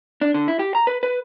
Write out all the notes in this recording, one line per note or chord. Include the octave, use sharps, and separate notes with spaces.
D4
D3
E4
G4
A#5
B4
B4